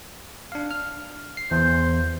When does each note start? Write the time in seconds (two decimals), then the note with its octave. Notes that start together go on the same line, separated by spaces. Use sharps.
0.52 D4 F5
0.71 F6
1.37 C7
1.51 E2 C5